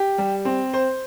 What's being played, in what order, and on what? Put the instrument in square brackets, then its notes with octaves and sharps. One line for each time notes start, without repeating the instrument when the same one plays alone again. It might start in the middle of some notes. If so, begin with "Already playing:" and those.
Already playing: [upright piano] G4
G3
C4
C5